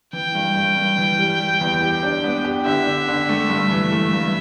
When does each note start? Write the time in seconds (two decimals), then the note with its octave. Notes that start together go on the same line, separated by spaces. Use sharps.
0.13 E3 G5
0.35 G2
0.56 G2
0.77 G2
0.98 E3
1.19 G3
1.40 G3
1.61 E2
1.82 G4
2.03 D4
2.24 B3
2.45 G4
2.65 D3 E5
2.87 D3
3.08 D3
3.29 A3
3.50 G2
3.71 E3
3.92 A3
4.13 G2